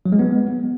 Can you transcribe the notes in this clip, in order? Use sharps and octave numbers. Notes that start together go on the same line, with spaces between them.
F#3
G#3
B3